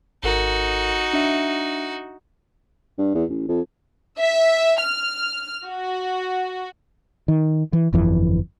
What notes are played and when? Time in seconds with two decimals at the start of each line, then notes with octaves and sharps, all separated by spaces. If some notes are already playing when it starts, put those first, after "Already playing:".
0.23 G#1 D#4 F#4 A4 A#4
1.13 D4 E5
2.98 G2
3.15 E2
3.29 A1
3.49 F2
4.18 E5
4.80 F6
5.65 F#4
7.28 D#3
7.73 E3
7.93 G1 F2 E3